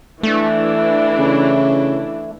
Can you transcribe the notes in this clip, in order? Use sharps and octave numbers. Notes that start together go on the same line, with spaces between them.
E3 A3 D4 E4
C#3